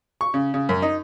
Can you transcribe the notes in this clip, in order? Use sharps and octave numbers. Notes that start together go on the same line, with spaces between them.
C#6
C#3
C#3
F#2
D#4